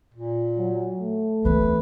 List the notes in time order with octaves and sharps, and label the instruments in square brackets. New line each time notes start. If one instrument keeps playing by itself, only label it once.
[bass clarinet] A#2
[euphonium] F#3
A3
[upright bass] E2 C4 [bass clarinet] B4